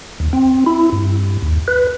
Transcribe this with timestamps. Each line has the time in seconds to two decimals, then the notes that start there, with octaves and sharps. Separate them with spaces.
0.20 D#2
0.33 C4
0.66 E4
0.92 G2
1.42 D#2
1.68 B4